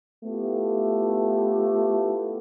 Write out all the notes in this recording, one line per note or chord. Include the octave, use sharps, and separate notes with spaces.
A3 B3 E4 F4 G4 A4